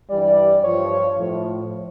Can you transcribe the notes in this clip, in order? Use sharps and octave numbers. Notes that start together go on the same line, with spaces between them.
G2 E3 G3 D5
G2 F3 C#5
A2 F3